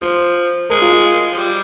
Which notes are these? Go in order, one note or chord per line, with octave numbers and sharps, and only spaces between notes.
F3 C5
G#3 A#4
F4
F4
F3
G3